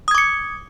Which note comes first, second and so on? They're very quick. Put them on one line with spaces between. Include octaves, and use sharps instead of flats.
D#6 G#6 D6 C#7